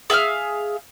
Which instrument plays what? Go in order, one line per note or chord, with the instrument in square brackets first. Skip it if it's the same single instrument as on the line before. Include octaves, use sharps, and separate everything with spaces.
[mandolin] G#4 E5 F5 F6